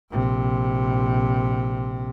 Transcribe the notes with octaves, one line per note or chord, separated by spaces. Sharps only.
A#1 C3